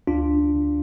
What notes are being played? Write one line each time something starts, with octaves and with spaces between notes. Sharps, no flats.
D2 D4 F4
D3